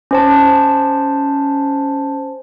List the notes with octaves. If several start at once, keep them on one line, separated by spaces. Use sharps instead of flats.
C#4 C5 A5